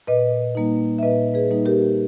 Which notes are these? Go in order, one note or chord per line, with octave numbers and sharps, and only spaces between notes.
A#2 B4 D#5
G3 A#3 D#4
E5
A#2 B4 D#5
G#4 B4
G3 A#3 D#4
G4 A#4